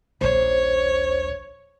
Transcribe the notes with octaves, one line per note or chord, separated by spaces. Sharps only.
D#1 A#1 C5 C#5